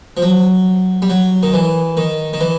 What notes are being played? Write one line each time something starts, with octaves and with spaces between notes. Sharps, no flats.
F3
F#3
G3
F#3
D#3
E3
D#3
D#3
E3